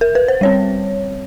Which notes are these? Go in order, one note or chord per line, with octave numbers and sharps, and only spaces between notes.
A#4
B4
C5
G3 C4 C#5